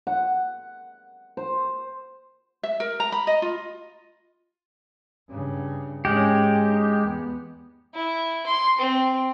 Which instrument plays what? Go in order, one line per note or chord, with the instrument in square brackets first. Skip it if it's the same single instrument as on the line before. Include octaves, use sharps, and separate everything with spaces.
[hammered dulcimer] F#5
C5
[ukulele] E5
A#4
A#5
B5
D#5
F4
[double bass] G2 C#3
[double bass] G#2 C#4 [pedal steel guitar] G#3 G4
[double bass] D#4
E2 B3
[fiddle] E4
C6
C4